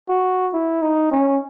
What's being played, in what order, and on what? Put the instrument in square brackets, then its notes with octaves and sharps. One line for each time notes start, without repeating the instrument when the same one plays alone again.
[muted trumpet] F#4
E4
D#4
C#4